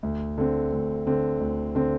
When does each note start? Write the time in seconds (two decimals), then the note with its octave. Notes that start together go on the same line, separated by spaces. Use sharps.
0.03 D2
0.38 D3 C4
0.72 D2
1.07 D3 C4
1.40 D2
1.75 D3 C4